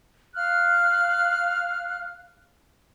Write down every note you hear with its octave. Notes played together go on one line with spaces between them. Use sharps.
F5 F6 F#6